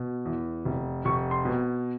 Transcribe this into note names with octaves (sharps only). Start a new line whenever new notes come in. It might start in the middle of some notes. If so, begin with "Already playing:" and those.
Already playing: B2
E2
F1
F1 C#6
C6
B2